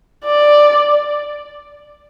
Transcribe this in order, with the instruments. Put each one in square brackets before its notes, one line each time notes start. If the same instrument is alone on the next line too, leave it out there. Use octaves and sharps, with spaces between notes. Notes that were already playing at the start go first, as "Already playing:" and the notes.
[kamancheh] D5